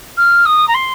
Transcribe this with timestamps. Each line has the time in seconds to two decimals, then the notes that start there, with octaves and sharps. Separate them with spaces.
0.17 F6
0.46 D#6
0.68 A#5
0.74 C6